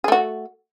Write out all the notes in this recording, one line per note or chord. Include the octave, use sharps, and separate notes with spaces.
A3 F#4 G#4